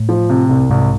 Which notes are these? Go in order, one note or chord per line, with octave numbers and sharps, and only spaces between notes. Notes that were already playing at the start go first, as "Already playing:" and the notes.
Already playing: A2
F3
C3
C2
C2 G#2